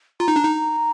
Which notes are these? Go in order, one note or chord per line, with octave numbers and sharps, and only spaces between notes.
F4 A#5
D#4
D4
D#4